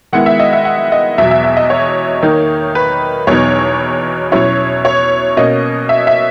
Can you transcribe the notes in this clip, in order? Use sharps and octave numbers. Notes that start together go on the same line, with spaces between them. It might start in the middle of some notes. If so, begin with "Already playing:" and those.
D#3 G#3 B3 E4 F#5
E5
D#5
E5
F#5
D#5
E2 B2 F#3 E5
E5
E5
D#5
C#5
D#3 A#3 D#4
B4
E2 B2 F#3 B3 D#4 C#5
B2 F#3 C#4 E4 C#5
C#5
B2 A#3 C#4 D#5
E5
E5